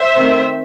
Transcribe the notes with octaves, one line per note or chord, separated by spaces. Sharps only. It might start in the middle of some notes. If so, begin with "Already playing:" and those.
Already playing: C5 E5
D#3 A3 C4